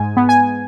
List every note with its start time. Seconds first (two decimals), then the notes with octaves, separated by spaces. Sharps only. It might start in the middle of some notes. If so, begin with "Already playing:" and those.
Already playing: G#2 G#5
0.17 B3
0.29 G#5